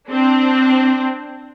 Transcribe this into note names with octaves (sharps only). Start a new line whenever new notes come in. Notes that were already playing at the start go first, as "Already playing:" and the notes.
C4 D4